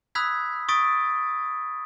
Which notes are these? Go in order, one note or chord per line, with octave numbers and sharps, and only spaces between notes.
B5 D#6 E6 F#6 G#6 B6
C#6 D#6 A6 B6 D7